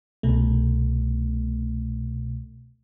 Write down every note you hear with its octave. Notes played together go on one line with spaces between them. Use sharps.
C2 B2 A3